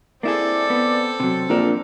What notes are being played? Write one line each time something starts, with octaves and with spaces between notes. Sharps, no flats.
A#3 C4 E4 G#4 A4 D5
B3
C3 F#3
A#1 F2 D4 A#4